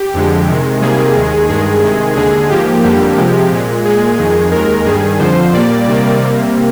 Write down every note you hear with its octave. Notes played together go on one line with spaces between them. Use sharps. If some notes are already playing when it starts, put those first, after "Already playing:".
Already playing: G4
F2 D3 G#3
C3 D#3 G#3
C3 D#3 G3 A#3 G#4
D#2 D#3 G#3
G2 D#3 G#3 G#4
C3 D#3 G#3
D#2 D3 G#3 G#4
G#2 F3 A#3 G4
F2 D3 G3 A#3
C3 F3 G#3
A#2 G#3
A#2 G#3 G#4
F2 D#3 G#3
D#2 D#3 G#3 A#4
G2 D#3 G3 G#4
F2 D3 F3 C5
A#2 G3 A#3 D5
C3 D#3 G3 A#3
C3 G3 A#3